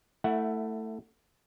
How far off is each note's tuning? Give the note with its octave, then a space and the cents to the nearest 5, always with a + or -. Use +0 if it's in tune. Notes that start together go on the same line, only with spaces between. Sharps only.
A3 +15 E4 +0 F#5 +0